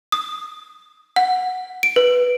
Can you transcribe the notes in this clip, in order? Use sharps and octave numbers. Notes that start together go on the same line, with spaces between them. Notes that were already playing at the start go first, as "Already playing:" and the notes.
D#6
F#5
D7
B4